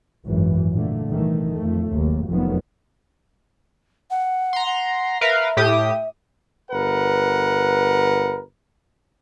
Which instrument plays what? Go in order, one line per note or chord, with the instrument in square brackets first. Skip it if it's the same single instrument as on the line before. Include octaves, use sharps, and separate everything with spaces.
[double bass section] G#1 F#2 E3
A#2 D3 A3
C2 D#3 E3 A3
F2 A3
F#1 D#2
F1 F2 D#3 F#3 B3
[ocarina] F#5
[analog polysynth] A#5 C6
[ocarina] F#5
[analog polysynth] A#4 B4 F5 [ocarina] E5
[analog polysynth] A2 G4 D#6
[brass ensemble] G1 A#4 B4 F#5